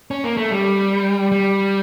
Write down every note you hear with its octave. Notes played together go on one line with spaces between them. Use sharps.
C#4
A#3
A3
G3
G3